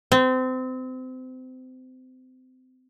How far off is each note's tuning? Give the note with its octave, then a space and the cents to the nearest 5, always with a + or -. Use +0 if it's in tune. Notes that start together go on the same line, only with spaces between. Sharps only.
C4 -30